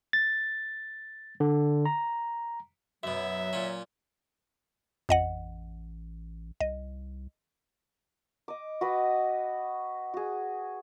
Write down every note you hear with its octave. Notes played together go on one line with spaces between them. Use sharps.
A6
D3
A#5
F#2 B2 F#3 E5
A#2 C#4
A1 F2 D#5 F#5
C2 D#5
D#5 D6
F#4 B4 D#5
F#4 G#4